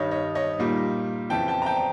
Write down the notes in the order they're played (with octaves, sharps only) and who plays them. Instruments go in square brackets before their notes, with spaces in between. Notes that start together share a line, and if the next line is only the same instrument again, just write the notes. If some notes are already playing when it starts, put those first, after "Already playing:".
Already playing: [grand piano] G2 D#3 G3 C#5 D#5
C#5 D#5
C#5 D#5
A#2 G3 A#3 D#4
F2 C#3 E3 G5 A5
G5 A5
A#5
G5 A5